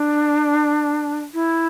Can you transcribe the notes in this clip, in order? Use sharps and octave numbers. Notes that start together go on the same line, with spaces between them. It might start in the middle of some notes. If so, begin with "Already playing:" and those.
Already playing: D4
E4